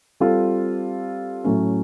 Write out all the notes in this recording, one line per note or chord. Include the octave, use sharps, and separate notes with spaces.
G3 C4 F4 A4
A2 F#3 A3 C#4